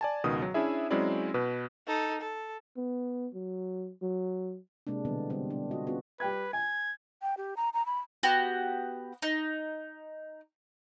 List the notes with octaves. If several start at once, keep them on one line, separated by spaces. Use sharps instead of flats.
D5 G#5 A5
C#2 B2 D#3 D#6
F#3
C#4 D4 E4 G#4 E5
F#3 G#3 C4 C#4 E4 D5
B2 B4
D#4 A4
A4
B3
F#3
F#3
C3 G#3 A#3 D4
B2 D3 E3 G3 B3
D3 G3 C4 D4
D4
F4 F#4 D#5
B3 C#4 F4 F#4 G#4
G3 B4 G5 G#6
G#5 G#6
G5
G4
A#5
A#5
B5
B3 F#4 G4
D#4